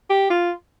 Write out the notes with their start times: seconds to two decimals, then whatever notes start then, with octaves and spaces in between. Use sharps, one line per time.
0.10 G4
0.30 F4